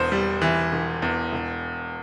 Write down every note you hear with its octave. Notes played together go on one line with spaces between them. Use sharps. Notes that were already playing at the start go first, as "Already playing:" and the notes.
Already playing: E1 E2 C5
G3
E3
E1
E2
E1